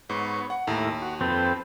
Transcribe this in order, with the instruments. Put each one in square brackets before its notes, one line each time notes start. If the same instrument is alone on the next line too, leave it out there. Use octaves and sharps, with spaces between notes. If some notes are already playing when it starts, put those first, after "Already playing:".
[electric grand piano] G#2 [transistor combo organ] B3 C#5
[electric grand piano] F#5
[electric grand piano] D#2 [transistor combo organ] A2 E4 A#4
[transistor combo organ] F#4
[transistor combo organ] F2 A4 B4 [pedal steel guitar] C4